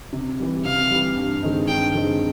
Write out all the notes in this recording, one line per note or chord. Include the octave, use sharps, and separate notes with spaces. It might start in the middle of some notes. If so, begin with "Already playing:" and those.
C3
E3 G3
C3 F5
E3 G3
G2
D#3 G#3 C4 D#4
G2 G5
D#3 G#3 C4 D#4